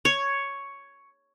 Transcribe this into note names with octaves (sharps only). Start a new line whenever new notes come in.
C#5